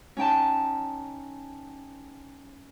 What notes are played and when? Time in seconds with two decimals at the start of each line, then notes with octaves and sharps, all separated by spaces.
0.17 C#4 D#4 G5 A5